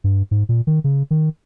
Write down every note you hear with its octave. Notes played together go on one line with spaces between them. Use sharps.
G2
G#2
A#2
D#3
C#3
D#3